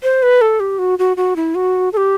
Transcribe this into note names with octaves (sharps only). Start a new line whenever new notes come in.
C5
B4
A4
G4
F#4
F#4
F#4
E4
F#4
A4
G4